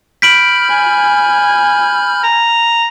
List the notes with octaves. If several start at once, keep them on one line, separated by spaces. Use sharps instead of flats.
B5 F6 G6 B6 D7 F#7
G#5
A#5